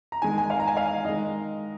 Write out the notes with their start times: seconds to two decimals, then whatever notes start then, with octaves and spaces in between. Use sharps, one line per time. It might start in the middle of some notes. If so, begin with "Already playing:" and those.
0.12 A#5
0.22 D#3 G#3 G#5
0.38 G#5
0.50 F5
0.60 A#5
0.67 G#5
0.77 F5
1.04 D#3 G#3 D#5